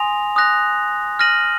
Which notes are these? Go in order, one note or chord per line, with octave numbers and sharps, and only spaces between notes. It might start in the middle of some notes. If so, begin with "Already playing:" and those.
Already playing: G#5 C6 D#6 A#6 F7
D#6 F#6 A#6 F7
F6 A#6 D#7 F#7